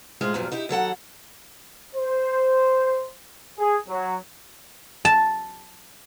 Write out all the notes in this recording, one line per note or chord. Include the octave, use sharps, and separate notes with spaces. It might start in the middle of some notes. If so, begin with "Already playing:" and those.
A2 G#3 F4 G#4 C5
E2 G2 A#2 F3 F#3
D#4 E4 G4
D#2 F#3 A4 F#5
C5
G#4
F#3
A5